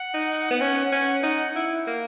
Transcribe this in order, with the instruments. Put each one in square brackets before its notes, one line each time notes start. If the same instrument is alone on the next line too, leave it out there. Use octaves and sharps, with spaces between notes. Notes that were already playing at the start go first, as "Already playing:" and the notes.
Already playing: [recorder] F#5
[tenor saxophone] D#4
B3
C#4
C#4
D#4
E4
A#3